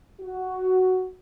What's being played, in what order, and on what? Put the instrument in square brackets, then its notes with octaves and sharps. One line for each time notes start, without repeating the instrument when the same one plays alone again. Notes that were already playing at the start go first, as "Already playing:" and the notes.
[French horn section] F#4